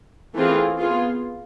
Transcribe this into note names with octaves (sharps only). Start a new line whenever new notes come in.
E3 A3 C4 F4 G#4
B3 F4 G#4